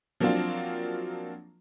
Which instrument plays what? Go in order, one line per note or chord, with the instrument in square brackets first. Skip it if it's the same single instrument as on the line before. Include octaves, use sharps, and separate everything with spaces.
[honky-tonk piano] F3 F#3 A#3 C4 D4 F4